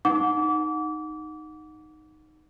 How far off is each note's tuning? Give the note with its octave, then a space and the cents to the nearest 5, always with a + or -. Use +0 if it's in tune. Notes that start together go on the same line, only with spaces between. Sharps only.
D#4 -5 F#5 -20 D6 -30